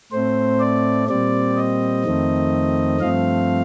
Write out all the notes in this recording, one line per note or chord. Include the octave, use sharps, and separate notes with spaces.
A2 A3 C4 C5
D5
A#2 G3 C4 D5
D#5
F2 D#3 A3 C4
G2 F3 A3 C4 F5